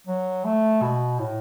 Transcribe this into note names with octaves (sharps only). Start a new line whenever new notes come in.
F#3
A3
B2
A2